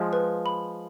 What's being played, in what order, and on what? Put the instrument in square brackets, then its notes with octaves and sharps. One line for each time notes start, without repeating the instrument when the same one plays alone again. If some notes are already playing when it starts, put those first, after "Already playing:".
Already playing: [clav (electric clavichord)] F3 G#3
[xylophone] B4
B5